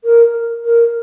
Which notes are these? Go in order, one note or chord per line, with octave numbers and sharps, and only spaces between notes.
A#4
A#4